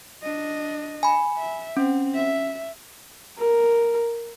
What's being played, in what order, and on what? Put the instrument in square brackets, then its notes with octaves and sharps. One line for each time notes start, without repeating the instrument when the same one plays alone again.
[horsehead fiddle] D4 D#5
[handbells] G#5 B5
[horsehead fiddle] E5
[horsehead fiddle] C4 [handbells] C#4
[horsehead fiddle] E5
[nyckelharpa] A#4